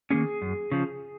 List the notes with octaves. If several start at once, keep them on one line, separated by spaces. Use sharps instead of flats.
D#3 A#3 C#4 G#4
F#2
C#3 F3